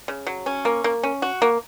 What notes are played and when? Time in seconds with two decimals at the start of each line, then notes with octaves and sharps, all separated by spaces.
0.08 C#3
0.27 F#3
0.46 C#4
0.65 A#3
0.84 A#3
1.03 C#4
1.22 F#4
1.42 A#3